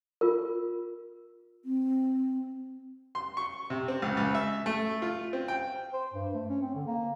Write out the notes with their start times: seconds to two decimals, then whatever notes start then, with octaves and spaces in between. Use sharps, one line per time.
0.21 F4 A#4
1.65 C4
3.15 C6
3.37 C#6
3.70 C3
3.88 C4
4.02 C#2
4.17 C#2
4.35 E5
4.66 A3
5.02 F4
5.33 C4
5.48 G5
5.93 C5
6.13 G2
6.34 A3
6.49 C#4
6.62 C4
6.75 D3
6.87 A#3